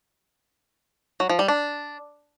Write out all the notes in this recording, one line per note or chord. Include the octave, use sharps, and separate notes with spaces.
F#3
F3
G3
D4